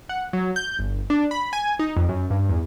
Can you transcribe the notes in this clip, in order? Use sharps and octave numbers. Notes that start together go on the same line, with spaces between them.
F#5
F#3
G6
G1
D4
B5
G#5
D#4
F2
F#2
G2
E2